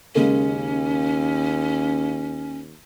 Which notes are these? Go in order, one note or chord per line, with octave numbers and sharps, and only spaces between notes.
D#2 C#3 G#3 A#3 C#4